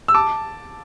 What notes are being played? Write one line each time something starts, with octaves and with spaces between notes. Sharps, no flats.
E6
A5 D6